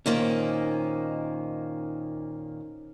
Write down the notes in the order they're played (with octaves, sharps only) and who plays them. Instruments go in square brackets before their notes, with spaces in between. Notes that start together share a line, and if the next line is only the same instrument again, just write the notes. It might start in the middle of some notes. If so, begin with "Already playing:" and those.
[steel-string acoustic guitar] A#2 D#3 A#3 [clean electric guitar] C#4 D#4 C5